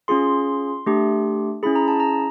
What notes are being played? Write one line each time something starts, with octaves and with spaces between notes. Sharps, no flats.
C#4 F4 G#4 C6
A3 D4 G4
C#4 E4 G#4 B5
A#5
A5
A#5